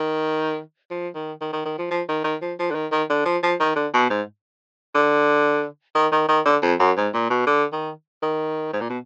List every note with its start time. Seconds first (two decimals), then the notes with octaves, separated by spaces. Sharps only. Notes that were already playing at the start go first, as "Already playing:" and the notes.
Already playing: D#3
0.90 F3
1.15 D#3
1.41 D#3
1.52 D#3
1.65 D#3
1.78 F3
1.90 F3
2.08 D#3
2.24 D#3
2.42 F3
2.59 F3
2.70 D3
2.75 D#3
2.91 D#3
3.09 D3
3.25 F3
3.43 F3
3.60 D#3
3.76 D3
3.93 B2
4.10 G#2
4.95 D3
5.95 D#3
6.12 D#3
6.28 D#3
6.45 D3
6.62 F2
6.79 F#2
6.97 G#2
7.14 A#2
7.30 B2
7.47 D3
7.72 D#3
8.22 D#3
8.73 G#2
8.81 A#2
8.89 B2